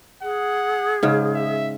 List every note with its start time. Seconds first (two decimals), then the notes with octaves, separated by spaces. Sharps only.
0.23 G#4 F#5
1.03 G#2 C#3
1.34 E5